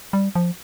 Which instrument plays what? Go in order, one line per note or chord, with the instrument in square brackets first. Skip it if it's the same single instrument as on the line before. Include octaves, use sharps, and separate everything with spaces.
[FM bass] G3
F3